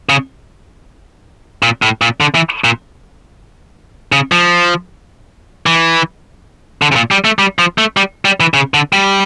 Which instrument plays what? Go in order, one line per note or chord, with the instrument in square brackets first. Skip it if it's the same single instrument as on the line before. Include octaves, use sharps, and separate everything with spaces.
[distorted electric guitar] C#3
A#2
A2
A#2
D3
E3
A#2
C#3
F3
E3
D3
C#3
A#2
G3
A3
G3
F3
A3
G3
G3
E3
C#3
D3
G3